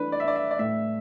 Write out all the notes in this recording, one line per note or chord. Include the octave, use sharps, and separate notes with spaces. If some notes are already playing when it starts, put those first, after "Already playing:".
Already playing: E3 A3 D4 B4
D5
E5
D4 D5
E5
D5
A2 E5